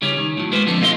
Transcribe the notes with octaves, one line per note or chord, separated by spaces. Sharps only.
C#3 G3 C#4
D#3
A2 F#3
G#3 A#3 B4 C5
D3 F3 A3 B3 C4
B1 A3 C#4 F4 D#5 C6